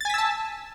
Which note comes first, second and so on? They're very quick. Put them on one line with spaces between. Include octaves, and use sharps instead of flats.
A6 G#5 B6 E6 A5